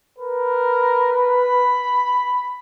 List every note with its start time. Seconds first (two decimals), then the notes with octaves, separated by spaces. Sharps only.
0.19 A#4 B4
1.12 B5